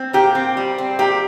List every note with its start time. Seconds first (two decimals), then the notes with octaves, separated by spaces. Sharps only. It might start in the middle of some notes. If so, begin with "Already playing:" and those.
Already playing: C4
0.13 A#2 G4
0.35 C4
0.57 G3
0.78 C4
0.99 A#2 G4